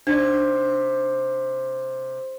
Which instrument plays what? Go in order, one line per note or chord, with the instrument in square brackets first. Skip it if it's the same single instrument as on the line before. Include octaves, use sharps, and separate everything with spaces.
[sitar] C3 [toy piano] D4 D#4 D5